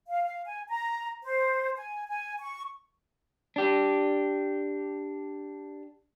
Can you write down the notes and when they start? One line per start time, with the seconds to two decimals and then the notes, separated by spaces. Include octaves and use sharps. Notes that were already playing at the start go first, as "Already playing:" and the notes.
0.09 F5
0.24 F5
0.45 G#5
0.69 A#5
1.23 C5
1.77 G#5
2.08 G#5
2.40 C#6
3.56 D4 G4